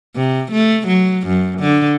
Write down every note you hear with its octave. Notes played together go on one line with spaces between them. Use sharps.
C3
A3
F#3
F#2
D3